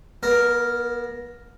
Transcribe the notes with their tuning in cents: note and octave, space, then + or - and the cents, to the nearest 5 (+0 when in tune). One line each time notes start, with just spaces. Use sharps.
B3 -40 A#4 +0